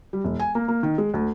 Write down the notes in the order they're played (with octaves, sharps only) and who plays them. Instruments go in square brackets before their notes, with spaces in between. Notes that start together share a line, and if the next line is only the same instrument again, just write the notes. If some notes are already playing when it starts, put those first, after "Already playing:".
[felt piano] G3
E1
G#5
A#3
A#3
D#3
G#3
D2